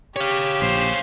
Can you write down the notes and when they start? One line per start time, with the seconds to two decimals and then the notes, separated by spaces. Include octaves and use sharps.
0.16 G4 C#5 F5
0.62 A#1 C5